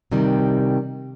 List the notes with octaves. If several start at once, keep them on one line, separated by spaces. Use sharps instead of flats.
C3 D#3 G3